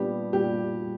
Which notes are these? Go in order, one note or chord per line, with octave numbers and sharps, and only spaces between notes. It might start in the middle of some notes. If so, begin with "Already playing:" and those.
Already playing: A#2 G3 B3 D4 G4
A#2 G3 G4